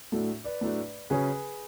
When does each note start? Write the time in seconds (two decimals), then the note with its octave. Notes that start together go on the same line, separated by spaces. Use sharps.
0.12 A2 F#3 A3 D4 F#4 A4
0.44 B4 D5
0.61 A2 F#3 A3 D4
1.10 C#3 F#3 C#4 G#4 B4